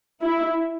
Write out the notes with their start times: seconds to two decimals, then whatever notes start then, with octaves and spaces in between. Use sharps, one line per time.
0.23 E4